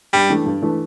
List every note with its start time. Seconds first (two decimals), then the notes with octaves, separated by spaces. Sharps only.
0.13 G2 G3
0.29 E3 A3 D4
0.46 G2
0.62 E3 A3 D4